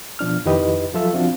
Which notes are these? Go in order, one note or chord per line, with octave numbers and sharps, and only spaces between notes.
B2 F3 D4 F6
F2 D#3 E4 G4 B4 D#5
F3 F#3 F4 A4 E5
F3 C4 D4 F4 F#4